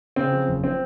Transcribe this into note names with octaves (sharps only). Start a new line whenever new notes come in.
C#3 C4
F3
F#1
C4